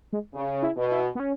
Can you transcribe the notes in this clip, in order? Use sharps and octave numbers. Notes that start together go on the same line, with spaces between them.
G#3
C#3
E4
B2
E4
B3
C#4